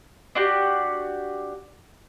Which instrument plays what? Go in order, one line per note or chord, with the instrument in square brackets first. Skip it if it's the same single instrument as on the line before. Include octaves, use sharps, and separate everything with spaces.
[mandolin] D4 F#4 G4